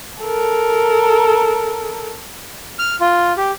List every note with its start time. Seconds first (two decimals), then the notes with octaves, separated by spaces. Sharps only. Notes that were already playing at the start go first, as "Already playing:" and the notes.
0.23 A4 A#4
2.79 F6
3.01 F4
3.37 G4